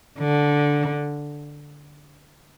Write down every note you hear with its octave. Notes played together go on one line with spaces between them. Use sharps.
D3